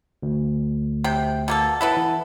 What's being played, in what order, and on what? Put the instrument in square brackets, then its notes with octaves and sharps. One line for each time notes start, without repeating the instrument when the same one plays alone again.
[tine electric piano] D2
[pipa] C3 G5
B2 A#3 A4
[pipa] B3 E4 A4 [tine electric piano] B4 B5
[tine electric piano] E3